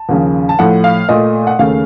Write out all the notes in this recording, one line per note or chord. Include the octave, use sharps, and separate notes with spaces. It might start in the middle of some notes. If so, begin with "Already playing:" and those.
Already playing: A5
D#2 C#3 F3
A5
A2 F3 A3 F#5
F5
A#2 A3 D#5
F#5
D#2 C#3 A3 F5